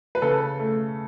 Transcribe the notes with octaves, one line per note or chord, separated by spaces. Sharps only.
B4
C#3 A4
A3